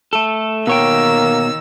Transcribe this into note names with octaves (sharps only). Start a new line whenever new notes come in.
A3 A4
B2 D#3 A#3 C#5 G5 E6